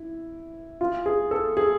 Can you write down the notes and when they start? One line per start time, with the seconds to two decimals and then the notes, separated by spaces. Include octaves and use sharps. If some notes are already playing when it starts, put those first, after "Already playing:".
Already playing: E4
0.81 F4
1.06 G#4
1.31 A4
1.57 G#4